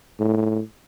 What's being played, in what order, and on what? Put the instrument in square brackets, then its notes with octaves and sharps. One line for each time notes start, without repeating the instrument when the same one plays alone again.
[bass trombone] A2